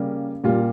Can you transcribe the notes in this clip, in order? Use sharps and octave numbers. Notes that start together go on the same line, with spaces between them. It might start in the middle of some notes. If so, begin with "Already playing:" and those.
Already playing: C#3 G3 A#3
A#2 G3 A#3 F4